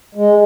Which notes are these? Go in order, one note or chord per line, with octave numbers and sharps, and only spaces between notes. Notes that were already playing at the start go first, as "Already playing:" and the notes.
G#3